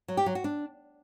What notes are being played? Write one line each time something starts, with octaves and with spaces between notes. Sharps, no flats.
F#3
G4
F#3
F#4
D4